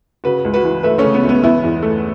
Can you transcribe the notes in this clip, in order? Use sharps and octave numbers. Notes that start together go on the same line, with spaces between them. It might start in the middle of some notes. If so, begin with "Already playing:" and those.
C#3 F#4 B4
C#2
F#4 B4
E3
A3 B4 E5
A3 C#4
C#3
B3
C#2
B3
E3 B3 E4
E2
A3